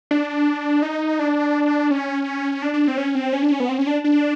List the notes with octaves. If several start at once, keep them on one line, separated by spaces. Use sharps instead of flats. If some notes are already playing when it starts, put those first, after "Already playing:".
D4
D#4
D4
C#4
D4
D4
C4
C#4
C4
C#4
D4
C#4
B3
C4
C#4
D4
D4